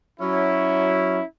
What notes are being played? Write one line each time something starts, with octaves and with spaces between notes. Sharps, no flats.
F#3 C#4 E4